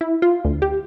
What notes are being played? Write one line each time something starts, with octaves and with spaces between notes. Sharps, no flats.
E4
F4
D2
G4